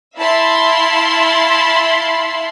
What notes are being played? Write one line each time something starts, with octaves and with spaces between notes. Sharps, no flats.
E4 E5 F5 A5 B5 C6